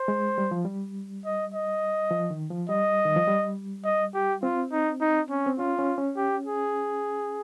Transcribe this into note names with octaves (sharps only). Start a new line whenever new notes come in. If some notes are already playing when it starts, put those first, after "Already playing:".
Already playing: C5
G#3
G3
F3
G3
D#5
D#5
F3
D#3
F3
G3 D#5
D#3
F3
G3
D#5
G4
C4 F4
D#4
D#4
C#4
C4
C#4 F4
C#4
C#4
G4
G#4